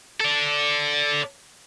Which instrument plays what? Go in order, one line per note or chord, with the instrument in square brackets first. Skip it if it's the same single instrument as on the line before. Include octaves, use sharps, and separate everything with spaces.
[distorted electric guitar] A4 D5